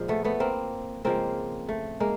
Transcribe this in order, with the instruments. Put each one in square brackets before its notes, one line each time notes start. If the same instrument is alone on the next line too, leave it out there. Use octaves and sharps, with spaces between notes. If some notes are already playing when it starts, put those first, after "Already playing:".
Already playing: [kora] A#2 F3 G#3
A3 B3
A3 B3
A#3 C4
C#3 F3 G#3 A#3 C4
A3
G#3 A#3